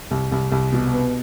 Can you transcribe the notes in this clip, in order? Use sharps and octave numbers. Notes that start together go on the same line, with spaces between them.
C2
C2
C2
B2
B3